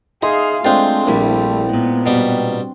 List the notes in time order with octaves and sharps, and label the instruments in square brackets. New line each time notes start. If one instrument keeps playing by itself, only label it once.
[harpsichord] D#4 [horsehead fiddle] G#4 F5 [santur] E5 C6
[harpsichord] G#3 F4 [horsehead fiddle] A3 [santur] C4 D4 C5
[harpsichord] A#1 [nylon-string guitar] G3 A#3 E4
[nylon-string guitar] A#2 G#3 [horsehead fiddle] B3
[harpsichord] B2 G3